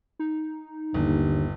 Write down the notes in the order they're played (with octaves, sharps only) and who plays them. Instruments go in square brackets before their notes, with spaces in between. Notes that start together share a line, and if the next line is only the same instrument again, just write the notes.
[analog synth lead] D#4
[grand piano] G1 [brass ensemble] D#2 [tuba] D3